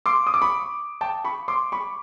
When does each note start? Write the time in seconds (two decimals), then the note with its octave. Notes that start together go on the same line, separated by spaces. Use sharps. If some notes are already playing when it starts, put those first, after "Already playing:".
0.06 C6 D6
0.27 D#6
0.34 D6
0.42 B5 C#6
1.01 G5 A5
1.25 B5 C#6
1.48 C6 D6
1.72 B5 C#6